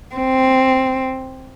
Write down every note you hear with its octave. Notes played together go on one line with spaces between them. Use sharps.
C4